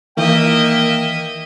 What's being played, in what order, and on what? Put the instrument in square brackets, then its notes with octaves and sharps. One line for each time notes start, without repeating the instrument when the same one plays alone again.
[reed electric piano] D#3 E3 [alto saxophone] A#3 [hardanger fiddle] D#5 E5 [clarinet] G5